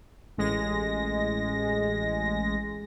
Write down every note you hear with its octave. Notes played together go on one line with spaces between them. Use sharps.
A1 G#3 A#6